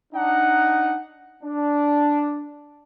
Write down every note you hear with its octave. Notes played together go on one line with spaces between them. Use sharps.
D4 D#4 F#5
D4